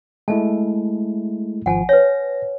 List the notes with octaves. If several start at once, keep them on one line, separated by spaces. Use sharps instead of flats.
G#3 A3 E4 A5
G#1 F3 F#5 G#5 A5
B4 C#5 A#6